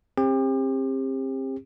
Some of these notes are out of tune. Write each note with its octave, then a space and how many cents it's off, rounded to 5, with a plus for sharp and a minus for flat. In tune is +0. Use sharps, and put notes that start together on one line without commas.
C4 +30 G4 +35